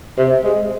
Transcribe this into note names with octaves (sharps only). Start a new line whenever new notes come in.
C3
G#3